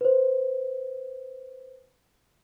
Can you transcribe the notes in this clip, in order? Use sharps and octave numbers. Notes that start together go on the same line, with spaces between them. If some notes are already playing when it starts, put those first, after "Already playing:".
B4 C5